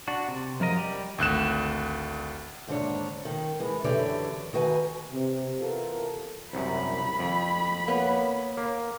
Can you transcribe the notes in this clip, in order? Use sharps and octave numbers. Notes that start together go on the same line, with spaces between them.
D4 F#4
C3
F#2 F3 A#4 D#5
G3 G4
G#1 D2 F#6 E7
D#2 G#2 D3 D4 C#5
D#3
E3 G#3
F#2 D3 E3 G4 C#5 D5
D#3 F#4 B4 G5 G#5
C3
C3 E3 B3 F4 A4 A#4
C2 F#2 B5
F2
A#3 B3 B4 C#5
A#3